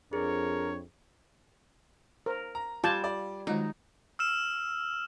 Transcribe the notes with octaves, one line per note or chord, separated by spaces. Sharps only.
F2 D4 G#4 A#4 C#5
A#4 C5
A#5
G3 F4 A5 D6 G6 G#6
D5
D#3 F#3 G#3 D#4 F4
E6 F6 E7